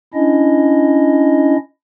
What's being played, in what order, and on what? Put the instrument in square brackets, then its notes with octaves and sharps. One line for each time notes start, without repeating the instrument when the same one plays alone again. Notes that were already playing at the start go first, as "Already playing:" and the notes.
[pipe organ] C#4 D4 E4 D#5